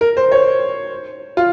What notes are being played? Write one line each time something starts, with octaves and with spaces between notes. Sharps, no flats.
A#4
C5
C#5
F4